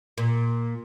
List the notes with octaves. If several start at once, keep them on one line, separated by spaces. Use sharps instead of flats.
A#2